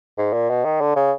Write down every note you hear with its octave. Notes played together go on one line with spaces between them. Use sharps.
G#2
A#2
B2
D#3
D3
C#3